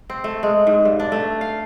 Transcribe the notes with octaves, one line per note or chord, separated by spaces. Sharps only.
C4
A3
G#3
G#2
G2
D4
A3
F5